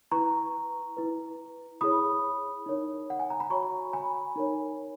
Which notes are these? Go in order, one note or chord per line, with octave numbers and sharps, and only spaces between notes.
E4 B4 A#5 C#6
E4 B4
E4 G#4 C#5 B5 D#6
D#4 A#4 C#5
F#5
G#5
A#5
B5
F#4 C#5 A#5 C#6
G#5 B5
D#4 A#4 C#5